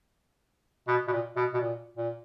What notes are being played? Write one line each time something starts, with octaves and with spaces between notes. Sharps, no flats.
B2
B2
A#2
B2
B2
A#2
A#2